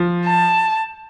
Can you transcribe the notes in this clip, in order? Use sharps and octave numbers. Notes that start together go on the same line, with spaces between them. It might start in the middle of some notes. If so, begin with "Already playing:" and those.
Already playing: F3
A5